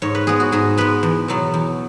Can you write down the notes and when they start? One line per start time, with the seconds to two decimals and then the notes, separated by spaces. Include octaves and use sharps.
0.02 G#2 C#5
0.15 B4
0.27 G#3 B3 G#4
0.40 F#4
0.52 G#2 G#4
0.77 G#3 B3 B4
1.03 E2
1.28 B2 F#3 B3
1.54 E2